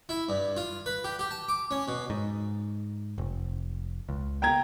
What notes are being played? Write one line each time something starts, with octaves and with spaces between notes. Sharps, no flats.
E4
G2
F4
B4
G4
G4
A5
D6
C#4
B2
G#2
F1
C#2
G5 A#5 G#6